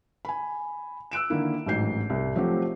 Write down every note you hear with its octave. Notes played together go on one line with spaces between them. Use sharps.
G#5 B5
E6 F#6 D7 E7
D3 D#3 A#3 E4
A1 G#2 F#3 G6 C7
C2
F3 F#3 A3 C4 F#4 G4